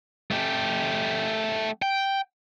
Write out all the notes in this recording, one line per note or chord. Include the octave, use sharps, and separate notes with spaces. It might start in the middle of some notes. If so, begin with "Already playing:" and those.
A3 G4
G5